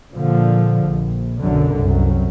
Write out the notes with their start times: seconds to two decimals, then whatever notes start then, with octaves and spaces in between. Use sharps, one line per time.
0.13 A#2 D3 F3
0.85 A#1
1.41 B1 F#2 D3
1.75 C2 F#2